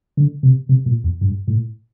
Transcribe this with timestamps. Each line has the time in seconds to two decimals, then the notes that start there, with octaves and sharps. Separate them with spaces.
0.17 D3
0.43 C3
0.69 C3
0.86 A#2
1.04 E2
1.21 G2
1.48 A2